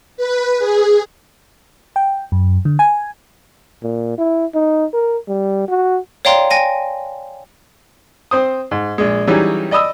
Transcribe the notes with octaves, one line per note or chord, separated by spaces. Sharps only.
B4
G#4
G5
F#2
D3
G#5
A#2
E4
D#4
A#4
G3
F#4
C#5 D5 F5 G5 A#5 C6
G5 G#5 A#6 D#7
C4 C5 D#6
G#2
A#1 G#3
E3 F#3 G3 C#4 D#4 G#4
D5 D#5 B5 D#6 E6